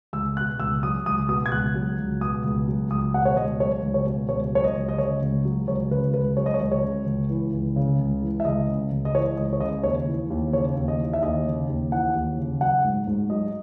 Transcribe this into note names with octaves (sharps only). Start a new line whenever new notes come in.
C#2 E6
B2 F#6
C#2 E6
F#3 D#6
C#2 D#6
B2 D#6
G#6
C#2 F#6
F#3
C#2
B2 D#6
C#2
F#3
C#2 D#6
B2 F#5
C#5
C#2 D#5
F#3 C#5
C#2
C#5
B2
C#2 C#5
F#3 C#5
D#5
C#2
D#5
C#3 C#5
C#2
F#3
C#2 C#5
C#3 B4
C#2 B4
F#3 C#5
D#5
C#5
C#2
C#5
C#3
C#2
E3
C#2
C#3
C#2
E3
E5
C#2 D#5
C#3
C#2
D#5
E3 C#5
C#2 D#5
C#5
C#3 D#5
D#2 C#5
E3
D#2
C#3 C#5
D#2
D#5
E3
E5
D#2 D#5
C#3
D#2
E3 F#5
D#2
C#3
F#3 F#5
G#2
G#2
F#3 D#5